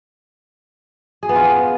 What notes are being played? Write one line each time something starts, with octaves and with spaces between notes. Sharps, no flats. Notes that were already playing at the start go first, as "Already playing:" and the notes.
G#4
B3
F4